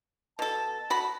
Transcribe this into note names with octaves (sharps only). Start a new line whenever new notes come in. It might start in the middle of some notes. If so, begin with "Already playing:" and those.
B2 A4 A5
F#4 B5